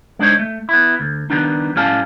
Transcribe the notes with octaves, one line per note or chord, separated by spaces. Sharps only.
G#3 D4 D#4 C5 C#5
A3
B3 E4
D2
D#3 E3 G3 B3 D4 D#4
A2 G3 C#4 F5 G#5 A5